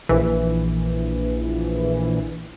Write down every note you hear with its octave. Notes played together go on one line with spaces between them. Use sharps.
A#1 E3